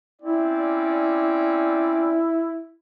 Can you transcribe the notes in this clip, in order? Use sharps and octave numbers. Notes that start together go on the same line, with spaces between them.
C4 C#4 E4 D5